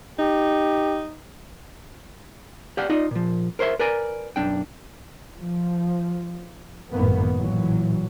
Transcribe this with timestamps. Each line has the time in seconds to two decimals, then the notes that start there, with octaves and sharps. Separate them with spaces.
0.19 D#4 G4
2.77 G4 D5 F5 F#5
2.90 D#4 F4 D5 D#5
3.11 A#2 F3
3.59 A#4 C5 C#5 E5 C6
3.79 A#4 B4 D5 G#5 A#5
4.36 B1 F#2 D4 G5
5.39 F3
6.92 G#1 F#2 A2 D#3 A#3 B3
7.38 A1 A#2 E3 F#3